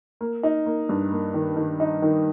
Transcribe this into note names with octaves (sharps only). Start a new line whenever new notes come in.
A#3
D#4
A#3
G2
A#3
D#3
D#3
D#4
D#3